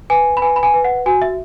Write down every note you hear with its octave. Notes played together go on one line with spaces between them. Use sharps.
B4 G#5
B5
B4 G#5
B5
G#5
B4
F#5
F#4 G#5
E5